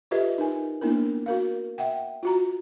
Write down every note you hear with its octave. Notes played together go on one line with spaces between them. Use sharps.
F4 G4 A4 B4 D#5 E5
D#4 A#4 G#5
A#3 B3 D4 E4 A#4
F#4 A#4 F5
E5 F#5 G5
F4 F#4 A#5